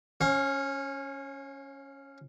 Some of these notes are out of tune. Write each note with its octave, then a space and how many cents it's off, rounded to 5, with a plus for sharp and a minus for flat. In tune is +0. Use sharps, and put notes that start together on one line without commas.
C#4 +0 C#5 -30 F5 +30